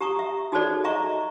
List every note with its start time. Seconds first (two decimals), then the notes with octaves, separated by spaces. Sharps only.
0.01 G4 A#5 C#6 D#6
0.19 E5
0.52 D#4 F#4 G#4 A4 C5 D5
0.84 D#5 E5 A#5 C#6